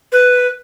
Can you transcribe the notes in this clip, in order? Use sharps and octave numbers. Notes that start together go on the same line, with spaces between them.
B4